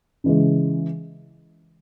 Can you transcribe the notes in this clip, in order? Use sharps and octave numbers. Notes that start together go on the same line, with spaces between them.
C#3 E3 G#3